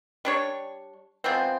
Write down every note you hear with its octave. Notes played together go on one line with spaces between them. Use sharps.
G3 D4 C#5
F3 G#3 B3 C4